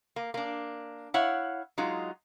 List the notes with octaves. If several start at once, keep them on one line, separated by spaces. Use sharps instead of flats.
A#3
A#3 D4
E4 C#5 F5 F#5
F#3 G#3 D#4 F4